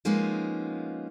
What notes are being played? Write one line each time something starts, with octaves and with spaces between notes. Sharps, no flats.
F3 G#3 A#3 B3 C#4 D#4